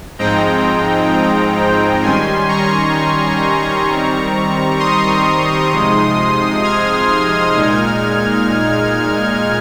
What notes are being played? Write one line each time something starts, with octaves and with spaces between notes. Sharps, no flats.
G#2 F3 G#3 C4 D#4 G5 A#5
D#3 G3 C#4 G#5 C6
A#5 C#6
D#3 G3 C4
C6 D#6
C3 F3 G#3 D#4
F6 G#6
A#2 G#3 D#4